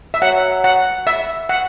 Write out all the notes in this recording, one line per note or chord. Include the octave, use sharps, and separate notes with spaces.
E5
F#3 F#5
F#5
E5
F#5